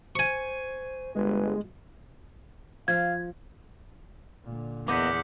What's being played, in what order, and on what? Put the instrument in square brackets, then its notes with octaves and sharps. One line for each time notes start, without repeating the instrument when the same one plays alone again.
[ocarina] C5 [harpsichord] G#5 C#6
[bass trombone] G1 [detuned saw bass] G#3 [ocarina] B4
[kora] F3 [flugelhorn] F5 [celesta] G#6
[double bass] A#2 D3
[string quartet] E2 F#5 [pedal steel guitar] A#3 B3 D#5 [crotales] D6 G6 B6